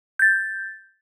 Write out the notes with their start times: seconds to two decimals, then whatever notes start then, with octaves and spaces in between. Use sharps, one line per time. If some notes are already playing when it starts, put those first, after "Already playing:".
0.19 G6 A6